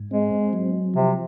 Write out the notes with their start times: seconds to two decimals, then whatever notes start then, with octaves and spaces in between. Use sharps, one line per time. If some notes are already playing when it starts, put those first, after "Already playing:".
Already playing: G#2
0.11 G#3 C4
0.53 F#3
0.94 C3 F3